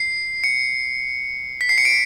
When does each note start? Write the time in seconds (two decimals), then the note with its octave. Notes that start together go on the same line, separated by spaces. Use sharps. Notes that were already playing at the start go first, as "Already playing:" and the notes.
Already playing: C7
0.44 C#7
1.61 B6
1.69 C7
1.78 C#7
1.85 D7